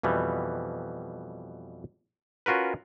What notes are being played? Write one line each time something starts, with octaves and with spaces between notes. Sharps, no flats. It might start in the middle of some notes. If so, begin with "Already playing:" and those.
F2 B2 E3 G3
C#4 F4 F#4 A#4 B4